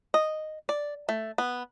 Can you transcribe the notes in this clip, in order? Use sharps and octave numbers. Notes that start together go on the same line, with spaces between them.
D#5
D5
A3
B3